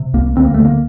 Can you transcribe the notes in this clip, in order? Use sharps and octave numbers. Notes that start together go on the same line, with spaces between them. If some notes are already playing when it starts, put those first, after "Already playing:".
Already playing: C3
C2 A#3
D2 C4
A#3
A3
D3
A#3